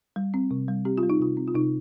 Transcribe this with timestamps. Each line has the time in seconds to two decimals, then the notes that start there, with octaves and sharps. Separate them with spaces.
0.16 G3
0.34 C4
0.51 C3
0.68 G3
0.85 C4 G4
0.98 F4
1.03 G3
1.10 D#4
1.20 C3 F4
1.37 C4
1.47 F4
1.54 C3 D#4